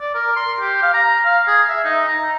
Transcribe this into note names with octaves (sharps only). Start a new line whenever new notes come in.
D5
A#4
C6
G4
F5
A#5
F5
G#4
E5
D#4
A#5